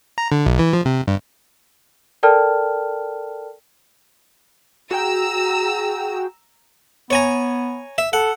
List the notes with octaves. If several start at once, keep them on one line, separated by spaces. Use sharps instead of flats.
A#5
D3
B1
E3
F3
C3
G2
A4 A#4 D5 G5 A5 F6
F#4 G#4 G5 A#5 E6
B3 C#5 G#5 A#5
E5
A4 F#5